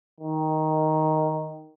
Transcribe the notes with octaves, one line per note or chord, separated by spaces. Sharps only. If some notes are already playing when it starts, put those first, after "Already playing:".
D#3